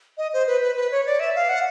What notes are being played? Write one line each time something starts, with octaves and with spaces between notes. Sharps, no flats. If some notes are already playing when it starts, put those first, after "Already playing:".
D#5
C5
B4
B4
B4
C#5
D5
E5
F5
F#5